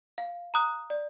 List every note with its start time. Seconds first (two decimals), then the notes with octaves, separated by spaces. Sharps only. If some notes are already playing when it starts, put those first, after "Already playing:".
0.18 F5
0.54 A#5 D#6 F#6
0.90 D5